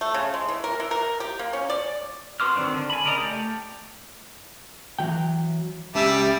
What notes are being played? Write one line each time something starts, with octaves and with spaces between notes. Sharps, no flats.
A3
C#3
G#3
E3
A#4
E3
A#4
G4
A#3
C#4
D5
F#4 B4 C6 D6 F6
D#3 F#3 C4 D4
D3
G#5 B5
C#3 A#4 D5 D#5 A#5
A3 G4
E3 F#3 G5
C#2 C#3 G3 G4 E5 A5 D6